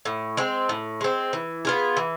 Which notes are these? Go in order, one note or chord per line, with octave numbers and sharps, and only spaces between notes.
A2
G#3 C4
A2
G#3 C4
E3
B3 F4 G#4
E3